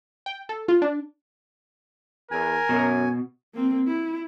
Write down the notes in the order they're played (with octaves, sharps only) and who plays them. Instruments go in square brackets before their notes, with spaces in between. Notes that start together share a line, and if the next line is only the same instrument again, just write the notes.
[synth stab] G5
A4
F4
D4
[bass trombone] E2 [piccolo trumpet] A#4 [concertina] G#5
[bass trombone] F#2 [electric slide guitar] B2
[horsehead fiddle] A#3 C4
E4